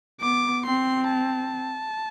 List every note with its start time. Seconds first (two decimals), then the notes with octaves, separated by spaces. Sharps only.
0.21 B3 D6
0.65 C4 C6
1.09 A5